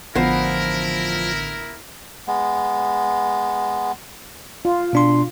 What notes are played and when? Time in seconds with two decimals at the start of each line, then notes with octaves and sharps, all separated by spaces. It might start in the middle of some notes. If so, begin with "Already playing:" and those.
0.15 A1 D3 F3 B3 E4 A#4 C5
2.27 G#3 B3
4.65 F4
4.93 B2 D4 C6